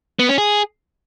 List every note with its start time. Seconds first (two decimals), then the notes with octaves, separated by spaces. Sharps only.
0.19 B3
0.29 C#4
0.38 G#4